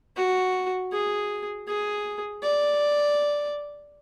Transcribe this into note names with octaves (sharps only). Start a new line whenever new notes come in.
F#4
G#4
G#4
D5